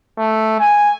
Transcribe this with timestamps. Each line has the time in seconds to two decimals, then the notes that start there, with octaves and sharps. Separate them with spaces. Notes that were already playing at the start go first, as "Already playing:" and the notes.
0.18 A3
0.60 G#5